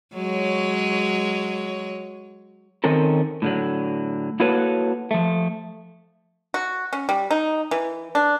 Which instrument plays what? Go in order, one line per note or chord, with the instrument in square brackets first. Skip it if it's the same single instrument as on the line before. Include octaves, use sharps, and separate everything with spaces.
[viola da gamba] F#3 G#3 C#5
[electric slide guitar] D#3 C4 C#4 A4 A#4
A2 D3 F#3
A#3 E4 F#4 A4 B4 C#5
F3 A3
[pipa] F#4
C#4
G3
D#4
E3
D4